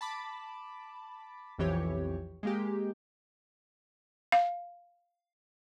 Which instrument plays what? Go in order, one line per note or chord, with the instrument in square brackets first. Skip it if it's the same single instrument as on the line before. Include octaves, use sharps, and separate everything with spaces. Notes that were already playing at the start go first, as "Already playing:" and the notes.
[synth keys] A5 B5 D6
B1 F2 E3 G4 C#5
G#3 A#3 G4
[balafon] F5